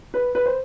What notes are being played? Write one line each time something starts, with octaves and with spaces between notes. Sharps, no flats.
B4
B4
C5